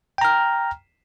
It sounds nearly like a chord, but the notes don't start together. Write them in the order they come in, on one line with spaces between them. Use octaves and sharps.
G5 A#5 F6